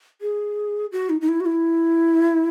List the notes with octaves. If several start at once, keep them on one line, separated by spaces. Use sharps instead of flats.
G#4
F#4
D#4
D#4
E4
F#4
E4